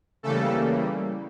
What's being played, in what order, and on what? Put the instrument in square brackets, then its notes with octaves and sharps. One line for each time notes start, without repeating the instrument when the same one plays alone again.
[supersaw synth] C#3 E3 G3 A3 A#3 A4